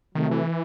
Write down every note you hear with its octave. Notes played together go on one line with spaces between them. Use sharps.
C3 D#3 F#3 A3
E3